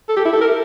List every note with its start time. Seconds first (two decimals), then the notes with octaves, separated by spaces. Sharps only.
0.09 A4
0.17 G4
0.25 E4
0.33 A4
0.41 A#4